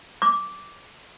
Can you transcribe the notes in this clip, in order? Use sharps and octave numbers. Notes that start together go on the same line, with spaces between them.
D6